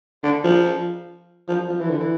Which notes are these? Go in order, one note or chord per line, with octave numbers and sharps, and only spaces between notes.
D3
F3
F3
F3
E3
D3
E3